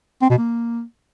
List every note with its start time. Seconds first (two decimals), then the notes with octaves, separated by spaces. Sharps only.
0.22 C4
0.30 B2
0.38 A#3